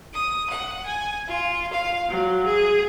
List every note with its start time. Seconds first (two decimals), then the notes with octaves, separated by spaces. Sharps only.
0.14 D#6
0.50 F#5
0.87 G#5
1.28 F4
1.73 F5
2.09 F#3
2.45 G#4